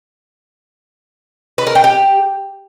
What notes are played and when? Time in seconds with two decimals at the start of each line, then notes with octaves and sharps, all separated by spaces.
1.58 B4
1.67 A#4
1.75 G5
1.84 G4